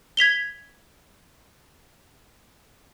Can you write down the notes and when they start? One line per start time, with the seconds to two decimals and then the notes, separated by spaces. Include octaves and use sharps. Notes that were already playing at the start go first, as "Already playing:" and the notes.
0.17 G#6 B6 F7 G7